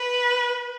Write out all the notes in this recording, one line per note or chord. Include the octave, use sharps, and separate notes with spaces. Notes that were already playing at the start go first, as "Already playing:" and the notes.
Already playing: B4